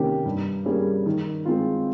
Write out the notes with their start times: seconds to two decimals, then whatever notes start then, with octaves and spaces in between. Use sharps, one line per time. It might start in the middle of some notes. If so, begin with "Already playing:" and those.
Already playing: C3 D#3 A#3 C#4 G4
0.25 G2
0.66 G3 A#3 C#4 G#4
1.06 D#3
1.45 G#3 C4 F4